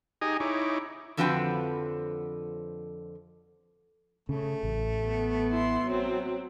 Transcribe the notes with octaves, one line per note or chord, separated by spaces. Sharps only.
D#4 G4 G#4 D#5 G#5 A#5
D#4 E4 C#5 D6
F2 D3 F3 F#4 B4 G5
C#3 A3
A1
B3
E4 C6
F#3 C4